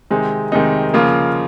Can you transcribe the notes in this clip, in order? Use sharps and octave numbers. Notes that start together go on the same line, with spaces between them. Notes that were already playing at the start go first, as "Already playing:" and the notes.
C3 D#3 G#3 C4 D#4
C3 D#3 G#3 C4 D#4
C#3 F3 A#3 F4